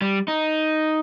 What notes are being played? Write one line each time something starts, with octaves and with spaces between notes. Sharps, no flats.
G3
D#4